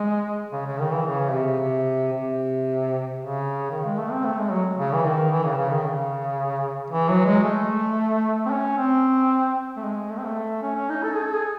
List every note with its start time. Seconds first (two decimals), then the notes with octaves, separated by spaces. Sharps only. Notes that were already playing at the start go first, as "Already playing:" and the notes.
Already playing: G#3
0.53 C#3
0.66 C#3
0.80 D#3
0.92 E3
1.06 C#3
1.32 C3
1.60 C3
2.13 C3
3.19 C#3
3.71 D#3
3.86 G#3
3.98 A3
4.11 C4
4.24 A3
4.39 G#3
4.52 F#3
4.78 C#3
4.94 E3
5.04 D#3
5.32 E3
5.44 C#3
5.57 C#3
5.71 D#3
5.85 C#3
6.90 E3
7.09 F#3
7.26 G#3
7.44 A3
8.46 C4
8.51 C#4
8.78 C4
9.77 A3
9.83 G#3
10.10 A3
10.17 C4
10.25 A3
10.62 C#4
10.76 C#4
10.90 D#4
11.03 A4
11.16 G#4
11.25 A4
11.35 G#4